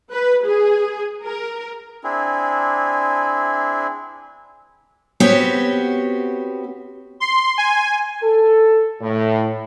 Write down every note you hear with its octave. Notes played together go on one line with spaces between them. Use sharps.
B4
G#4
A#4
C4 D4 E4 G#4
B3 C4 F#4 G4 C#5
C6
G#5
A4
A2